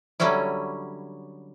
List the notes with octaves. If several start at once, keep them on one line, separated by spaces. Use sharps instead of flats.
D3 F#3 G3 C#4 E4